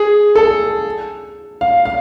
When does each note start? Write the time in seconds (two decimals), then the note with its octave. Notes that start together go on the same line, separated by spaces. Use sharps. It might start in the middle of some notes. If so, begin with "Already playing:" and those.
Already playing: G#4
0.36 A4
1.61 F5
1.85 F5